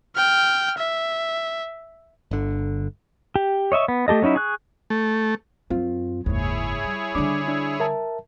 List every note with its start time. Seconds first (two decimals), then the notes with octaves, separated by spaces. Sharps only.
0.16 G5 F6
0.78 E5
2.31 G1 D3
3.36 G4
3.72 C#5 D#5 E5 C#6
3.88 B3
4.08 A3 G4 A4 D#5
4.22 F#3 C#4 D#4 E4
4.36 G#4 C#6 F#6
4.90 A3
5.70 F#2 C4 F4
6.26 F#1 D#2 G#2 E4 G#4 C#5
6.84 G3
7.15 D3 G3 D4 D6
7.48 D4 E6
7.80 A#4 E5 A5